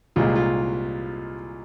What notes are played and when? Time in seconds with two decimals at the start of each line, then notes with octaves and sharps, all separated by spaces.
0.16 C2 A#2 G#3 F4
0.35 F4